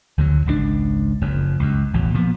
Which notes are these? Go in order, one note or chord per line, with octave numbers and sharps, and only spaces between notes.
D2 D3 F#3
G#1 C#2 C#3 D4
F#1 F2
C#2 F#2
A1 E2 B2
A#2 F3 B3